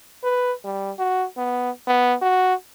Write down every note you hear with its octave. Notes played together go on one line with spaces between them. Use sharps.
B4
G3
F#4
B3
B3
F#4